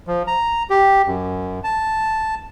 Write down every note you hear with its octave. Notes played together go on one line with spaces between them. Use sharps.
F3
A#5
G4
F#2
A5